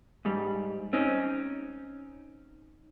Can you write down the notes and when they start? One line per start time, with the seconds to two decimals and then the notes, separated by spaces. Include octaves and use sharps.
0.25 G#2 G3
0.93 C4 C#4 D#4